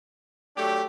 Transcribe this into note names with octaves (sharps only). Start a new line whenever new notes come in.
F#3 A3 D4 G4